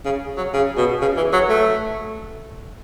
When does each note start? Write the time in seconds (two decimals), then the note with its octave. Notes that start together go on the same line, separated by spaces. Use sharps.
0.05 C#3
0.37 F#3
0.53 C#3
0.77 B2
1.01 C#3
1.17 E3
1.33 F#3
1.49 A3